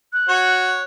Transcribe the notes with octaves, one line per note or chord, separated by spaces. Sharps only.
F#6
F#4 C#5